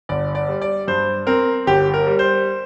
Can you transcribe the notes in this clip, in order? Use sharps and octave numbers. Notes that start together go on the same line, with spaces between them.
G1 D5
D5
G3
D5
G2 C5
C4 A#4
G1 G4
A#4
G3
C5